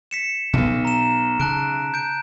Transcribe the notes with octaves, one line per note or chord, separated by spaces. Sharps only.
B6 C#7 E7
B1 B2 B3
A#5 E7
C#3 A5 F#6 D7
G6 D7